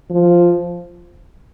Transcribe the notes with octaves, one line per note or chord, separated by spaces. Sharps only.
F3